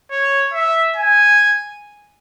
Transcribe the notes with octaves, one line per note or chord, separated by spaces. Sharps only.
C#5
E5
G#5